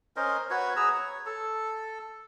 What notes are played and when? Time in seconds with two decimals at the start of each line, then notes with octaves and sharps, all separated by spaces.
0.16 C#4 A#4 C5 D#5
0.50 F#4 B4 C#5
0.76 G#4 B4 A#5 E6
0.93 C#5
1.26 A4